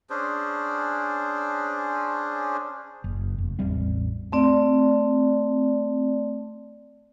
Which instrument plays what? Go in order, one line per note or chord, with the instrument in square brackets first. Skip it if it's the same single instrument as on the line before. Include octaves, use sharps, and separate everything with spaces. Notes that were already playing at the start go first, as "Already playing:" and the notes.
[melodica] C#4 D4 G#4 C5
[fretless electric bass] F#1
F1
A1 E2 G3 C4
[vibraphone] A3 C4 D5